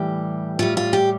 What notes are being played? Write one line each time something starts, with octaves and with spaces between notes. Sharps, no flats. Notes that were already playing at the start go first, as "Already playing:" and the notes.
Already playing: A2 E3 G3 G4
A2 G3 F4
F4
G4